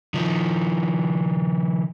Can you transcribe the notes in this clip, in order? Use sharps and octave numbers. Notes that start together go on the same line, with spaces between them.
D#3 F3